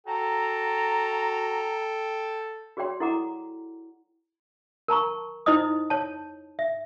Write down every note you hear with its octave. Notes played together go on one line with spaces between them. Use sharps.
F#4 A4 G5 A#5
F#4 G#4 C#5 D5 G5 C6
E4 A4 F#5 A#5 D6
A#4 A5 A#5 C#6
D#4 E4 C5 D#5 D#6
C#5 A5
E5